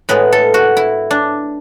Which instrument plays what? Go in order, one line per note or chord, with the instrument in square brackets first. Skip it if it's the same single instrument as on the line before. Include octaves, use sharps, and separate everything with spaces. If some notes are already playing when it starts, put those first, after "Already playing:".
[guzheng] A2 G#3 B3 B4
A4
F#4
E4
D4